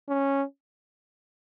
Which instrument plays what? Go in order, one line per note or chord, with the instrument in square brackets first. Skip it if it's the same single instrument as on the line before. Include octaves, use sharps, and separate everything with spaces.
[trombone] C#4